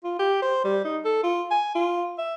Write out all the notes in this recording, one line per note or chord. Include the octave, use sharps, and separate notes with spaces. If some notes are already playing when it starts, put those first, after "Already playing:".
F4
G4
C5
G3
D#4
A4
F4
G#5
F4
E5